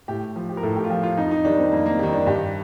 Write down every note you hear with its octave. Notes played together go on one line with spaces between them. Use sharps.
A2 G4
F3
G4
A#4
A2 A4
G4
F4
F3 G4
F4
F2 D#4
D#4
D#3 G3 D4
C4
F2 A#3
A#3
D#3 G3
D4
G2 G4